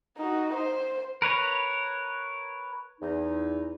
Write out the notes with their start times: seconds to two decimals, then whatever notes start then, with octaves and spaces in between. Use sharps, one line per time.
0.18 D#4 F#4
0.55 C5
1.22 A#4 B4 C#5 A#5
3.01 E2 D#4